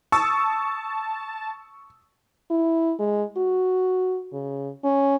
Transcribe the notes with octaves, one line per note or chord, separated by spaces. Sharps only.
A5 C#6 D#6 E6
E4
G#3
F#4
C#3
C#4